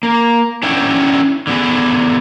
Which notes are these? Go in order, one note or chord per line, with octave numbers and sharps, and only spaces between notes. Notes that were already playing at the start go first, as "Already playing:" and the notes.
A#3
C#4 D4 E4 C#5 F#5 G5
D3 B3 G#4